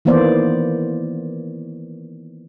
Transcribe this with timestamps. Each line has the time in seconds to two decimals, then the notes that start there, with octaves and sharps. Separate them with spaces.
0.05 D#3 E3 A#3 B3 C5 D5